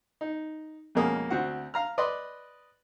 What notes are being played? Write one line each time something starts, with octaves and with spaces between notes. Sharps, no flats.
D#4
F2 B2 G#3 A#3 C#4 D#6
D2 C4 F#4 F#5
F5 A#5 F6
B4 D5 D#5 C6